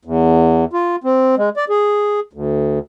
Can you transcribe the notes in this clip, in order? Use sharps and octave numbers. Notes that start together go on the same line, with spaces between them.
E2
F4
C4
G#3
D5
G#4
D2